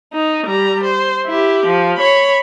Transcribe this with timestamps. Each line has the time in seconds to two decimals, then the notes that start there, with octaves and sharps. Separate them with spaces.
0.14 D#4
0.46 G3 A#5
0.84 C5
1.27 E4 G4
1.66 F3
1.98 C#5 B5